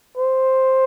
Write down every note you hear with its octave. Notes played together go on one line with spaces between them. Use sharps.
C5